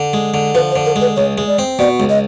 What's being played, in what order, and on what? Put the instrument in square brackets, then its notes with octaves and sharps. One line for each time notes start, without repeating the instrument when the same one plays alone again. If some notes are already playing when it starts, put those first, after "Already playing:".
Already playing: [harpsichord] D3
G#3
D3
[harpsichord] F3 [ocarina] B4
[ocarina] C5
[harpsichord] D3
[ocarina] A#4
[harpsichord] G#3
[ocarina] B4
[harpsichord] C#2 [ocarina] C#5
[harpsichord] G#3
[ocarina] D5
[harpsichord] C4
[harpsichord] B2 [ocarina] D5
[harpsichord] C#2
[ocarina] D#5